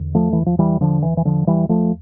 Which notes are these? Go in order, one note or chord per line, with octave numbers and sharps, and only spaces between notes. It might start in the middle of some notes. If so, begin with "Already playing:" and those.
Already playing: E2 D3
F3 A3
E3
F3
E3 G3
D3 F3
E3
E3
D3 F3
E3 G3
F3 A3